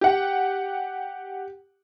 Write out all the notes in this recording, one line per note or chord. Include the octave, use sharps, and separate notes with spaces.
G4 F#5